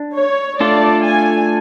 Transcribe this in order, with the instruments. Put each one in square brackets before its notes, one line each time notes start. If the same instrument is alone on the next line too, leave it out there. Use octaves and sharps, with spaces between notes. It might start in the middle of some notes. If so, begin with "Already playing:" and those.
Already playing: [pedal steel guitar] D4
[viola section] C#5
[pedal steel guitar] A3 D4 F4 A4 [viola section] D5
[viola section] G#5